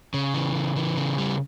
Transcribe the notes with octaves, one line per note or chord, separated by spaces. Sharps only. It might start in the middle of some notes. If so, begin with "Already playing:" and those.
C#3
E3
C#3
E3
C#3
G3